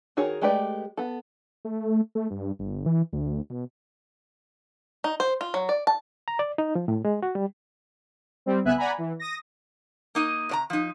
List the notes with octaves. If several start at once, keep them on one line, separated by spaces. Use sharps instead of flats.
D#3 F#4 G#4 A#4 C#5
G#3 A3 G4 B4 D5
B3 A4
A3
A3
G2
G1
E3
D2
B2
D#4
C5
F4
F#3
D5
A5
A#5
D5
D#4
F3
A2
G#3
F#4
G3
G3 C4
B1 C#3 B3 E5 G#5 F#6
D5 F#5 G#5 A#5 B5
E3
D#6 A#6
A#3 D#4 D#5
C3 D5 A#5
F3 D#4